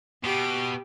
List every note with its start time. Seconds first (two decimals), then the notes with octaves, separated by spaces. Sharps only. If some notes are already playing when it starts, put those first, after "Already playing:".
0.24 B2 G4 D6